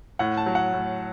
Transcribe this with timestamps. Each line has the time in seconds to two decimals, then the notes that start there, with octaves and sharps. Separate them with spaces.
0.19 A2 F#5
0.37 A5
0.46 F#3
0.55 F#5
0.73 A2